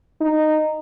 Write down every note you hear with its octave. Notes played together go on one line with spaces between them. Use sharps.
D#4